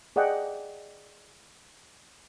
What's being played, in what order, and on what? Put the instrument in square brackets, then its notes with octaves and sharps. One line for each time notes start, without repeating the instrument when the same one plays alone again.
[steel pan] G#4 D5 D#5 F#5 G5